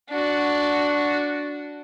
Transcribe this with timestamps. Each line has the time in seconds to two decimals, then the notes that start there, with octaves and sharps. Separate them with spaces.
0.10 D4 F#4